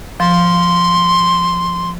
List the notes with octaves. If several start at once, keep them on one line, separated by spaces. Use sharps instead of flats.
F3 C6